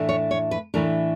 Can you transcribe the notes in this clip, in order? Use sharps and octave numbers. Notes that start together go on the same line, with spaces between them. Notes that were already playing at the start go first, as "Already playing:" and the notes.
Already playing: A2 E3 A3 D4
C#5
C#5
B4
A2 E3 A3 D4 A#4